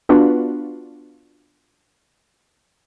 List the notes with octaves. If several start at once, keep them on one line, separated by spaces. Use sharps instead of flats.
B3 D4 F4 F#4 B4